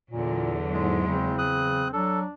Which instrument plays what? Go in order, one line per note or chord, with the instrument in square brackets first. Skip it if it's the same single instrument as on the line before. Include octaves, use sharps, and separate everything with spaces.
[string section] E2 F#3 [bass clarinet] A#2 [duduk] D3
[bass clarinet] G#2 [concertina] G#3
[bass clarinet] C#3 [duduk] C4
[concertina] D#6 F#6
[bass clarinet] F#3 [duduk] D4 [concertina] A4